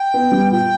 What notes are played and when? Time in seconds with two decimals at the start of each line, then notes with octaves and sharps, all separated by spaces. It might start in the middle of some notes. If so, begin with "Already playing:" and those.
Already playing: G5
0.14 B3
0.32 G3
0.51 A#2 G5